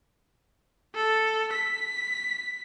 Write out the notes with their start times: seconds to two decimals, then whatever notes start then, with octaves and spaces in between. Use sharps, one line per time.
0.95 A4
1.53 B6